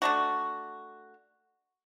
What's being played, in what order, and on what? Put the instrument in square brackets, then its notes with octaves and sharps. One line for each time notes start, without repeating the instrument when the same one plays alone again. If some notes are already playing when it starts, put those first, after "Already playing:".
[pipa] A3 D4 F#4